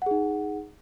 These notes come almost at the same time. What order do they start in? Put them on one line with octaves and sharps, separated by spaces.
F#5 G#4 D#4